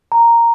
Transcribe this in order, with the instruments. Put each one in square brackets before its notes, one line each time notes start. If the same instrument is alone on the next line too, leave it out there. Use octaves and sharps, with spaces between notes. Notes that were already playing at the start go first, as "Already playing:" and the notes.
[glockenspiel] A#5